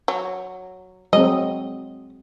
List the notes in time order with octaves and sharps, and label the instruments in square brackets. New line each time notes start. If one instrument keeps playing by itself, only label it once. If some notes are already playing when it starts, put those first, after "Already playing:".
[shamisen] F#3
[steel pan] F#3 G#3 C4 [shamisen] D#5